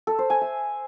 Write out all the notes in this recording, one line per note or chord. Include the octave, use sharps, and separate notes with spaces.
A4
C5
G#5
E5